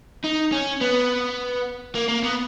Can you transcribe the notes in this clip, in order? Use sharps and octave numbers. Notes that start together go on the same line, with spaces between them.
D#4
C#4
B3
A#3
A#3
B3